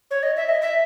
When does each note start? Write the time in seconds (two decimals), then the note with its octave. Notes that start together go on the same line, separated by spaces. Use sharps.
0.11 C#5
0.23 D#5
0.36 E5
0.49 D#5
0.62 E5